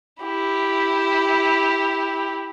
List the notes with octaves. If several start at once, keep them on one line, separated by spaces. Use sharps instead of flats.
E4 G4